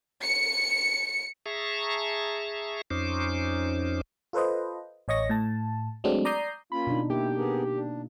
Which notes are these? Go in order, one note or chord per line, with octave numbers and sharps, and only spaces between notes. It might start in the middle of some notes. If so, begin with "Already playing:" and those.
C#7
G#4 E5 A5 A#5 C#6
F2 C#4 D#4 C5 D6
F4 A4 B4 C5 D#5
A1 C#5 D#5 C#6 A#6
A2 A5
F#3 G#3 A3 C4 D4
D5 A#5 D#6 G6 C7
A#3 C#4 F4 B5
B2 D4 D#4
A#3 E4 G4
B3 G#4 A#4
D4